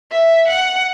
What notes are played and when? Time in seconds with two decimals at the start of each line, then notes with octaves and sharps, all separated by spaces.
0.12 E5
0.48 F#5